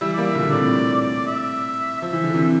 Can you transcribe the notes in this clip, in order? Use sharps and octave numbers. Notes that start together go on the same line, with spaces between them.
E3 G3 E5
G3 A#3 D5
E5
A#2 D3
D3
A2 C3 D5
D5
E5
F3 E5
E3
D3
C3 E3